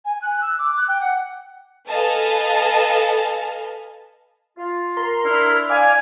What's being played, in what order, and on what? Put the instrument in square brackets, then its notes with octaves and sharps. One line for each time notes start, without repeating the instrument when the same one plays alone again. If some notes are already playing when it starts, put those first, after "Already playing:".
[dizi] G#5
F#6
E6
D6
F#6
G5
F#5
[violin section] A4 B4 D#5 F5 G#5 A5
[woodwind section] F4
[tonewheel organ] A#4 C6
[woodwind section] D4 E4 [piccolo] F6
[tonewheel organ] D5 F5 [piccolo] G#5